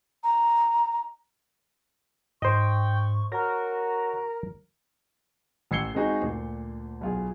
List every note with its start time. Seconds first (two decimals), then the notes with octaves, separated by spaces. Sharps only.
0.24 A#5
2.42 G#2 C5 D#5 G5 C#6
3.32 F#4 A#4 C#5 A#5
5.71 A1 E6 G#6 C7 C#7 G7
5.95 G#3 C4 D#4 F#4 G#4
6.22 D2 A#2
7.01 B1 F4 G#4